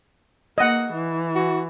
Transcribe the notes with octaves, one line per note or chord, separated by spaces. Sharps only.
A#3 D#5 F#5
E3
F#4